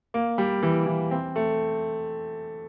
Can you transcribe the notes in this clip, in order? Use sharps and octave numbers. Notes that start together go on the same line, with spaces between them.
A#3
G3
E3
E3
C4
A3